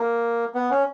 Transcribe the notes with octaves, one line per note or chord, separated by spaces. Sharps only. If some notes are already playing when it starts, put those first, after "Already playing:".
Already playing: A#3
B3
C#4